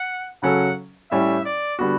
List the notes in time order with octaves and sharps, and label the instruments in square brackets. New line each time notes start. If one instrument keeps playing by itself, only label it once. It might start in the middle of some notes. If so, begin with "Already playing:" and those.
Already playing: [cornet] F#5
[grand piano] C#3 F#3 C#4 F#4 A4 [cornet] F#5
[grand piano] A2 G3 C#4 [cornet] E5
[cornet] D5
[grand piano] D3 G3 B3 F#4